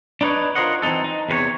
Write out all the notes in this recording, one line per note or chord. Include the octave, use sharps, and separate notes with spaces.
D4 D#4 B4 C#5
F4 A#4 C5 C#5 D#5 F#5
E3 C4 D4 D#4 A4
D#4
E2 C3 B4 C#5